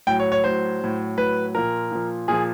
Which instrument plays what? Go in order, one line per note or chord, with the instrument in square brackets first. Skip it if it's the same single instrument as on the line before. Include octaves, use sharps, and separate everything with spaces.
[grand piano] A2 F#3 G5
C#5
C#5
A2 F#3 C5
A2 F#3
A2 F#3 B4
A#2 F3 A#4
A#2 F3
A#2 F3 G#4